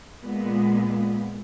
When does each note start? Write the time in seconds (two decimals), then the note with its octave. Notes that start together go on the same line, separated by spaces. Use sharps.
0.22 A#2 G#3 B3